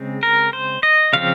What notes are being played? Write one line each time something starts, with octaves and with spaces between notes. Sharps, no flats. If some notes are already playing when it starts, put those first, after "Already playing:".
Already playing: C#3 G#3 C4
A#4
C5
D#5
C#3 F3 C4 F5